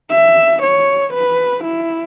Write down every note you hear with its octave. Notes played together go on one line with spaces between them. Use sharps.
E5
C#5
B4
E4